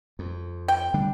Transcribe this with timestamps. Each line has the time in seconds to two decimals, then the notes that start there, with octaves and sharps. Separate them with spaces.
0.19 F2
0.68 G5
0.94 D3 G3 D4